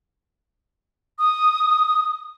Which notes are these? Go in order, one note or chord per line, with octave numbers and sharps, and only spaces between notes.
D#6